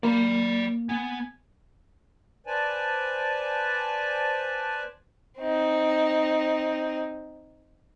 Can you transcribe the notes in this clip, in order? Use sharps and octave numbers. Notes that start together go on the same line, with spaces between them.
A#3 D5 B5
B3 G#5
B4 C5 D5 G#5 A5
C4 D#4